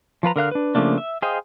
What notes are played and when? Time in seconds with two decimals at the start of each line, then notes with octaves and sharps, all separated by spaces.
0.23 F3 F4 B4 A#5
0.36 D3 A#4 F5 F#6
0.51 D4 B4
0.75 C#3 F3 A3 A#3 D4
0.98 E5
1.22 G#4 C5 D#5 F5 G5